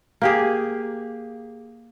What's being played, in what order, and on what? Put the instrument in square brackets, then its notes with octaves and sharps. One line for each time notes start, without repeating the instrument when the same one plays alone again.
[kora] A#3 G4 G#4